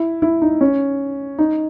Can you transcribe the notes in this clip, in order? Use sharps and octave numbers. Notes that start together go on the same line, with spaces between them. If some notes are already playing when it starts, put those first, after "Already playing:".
Already playing: E4
E4
D#4
C#4
D#4